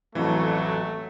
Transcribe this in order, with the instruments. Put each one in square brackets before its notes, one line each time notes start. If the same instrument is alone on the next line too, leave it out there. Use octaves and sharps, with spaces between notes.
[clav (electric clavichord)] A1 F2 [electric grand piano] E3 [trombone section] F#3 [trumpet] A3